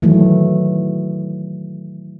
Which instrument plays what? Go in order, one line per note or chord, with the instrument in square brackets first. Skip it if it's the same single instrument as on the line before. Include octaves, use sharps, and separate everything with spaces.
[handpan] D#3 E3 F#3 A3